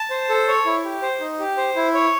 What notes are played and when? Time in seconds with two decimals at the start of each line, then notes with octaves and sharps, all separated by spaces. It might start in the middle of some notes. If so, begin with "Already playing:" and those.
Already playing: A5
0.10 C5
0.30 A4
0.48 C#5
0.65 E4
0.85 G4
1.02 C5
1.21 D#4
1.40 G4
1.57 C5
1.76 E4
1.94 C#5